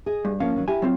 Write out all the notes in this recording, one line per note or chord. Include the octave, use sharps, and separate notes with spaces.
G#4 D#5
G2
F3 A#3 C#4 F5
D#3 F#3
E4 G4 G#5
F#3 C4 F4